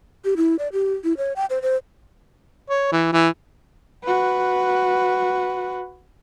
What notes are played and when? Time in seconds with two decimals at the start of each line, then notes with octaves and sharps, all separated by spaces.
0.25 G4
0.37 E4
0.59 D5
0.73 G4
1.04 E4
1.17 C#5
1.36 G5
1.50 C5
1.62 C5
2.70 C#5
2.92 E3
3.13 E3
4.04 F#4 B4